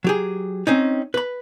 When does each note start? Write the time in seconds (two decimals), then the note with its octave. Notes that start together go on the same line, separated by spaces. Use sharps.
0.04 F#3 G4 G#4
0.67 C4 C#4 D#4
1.14 B4 B5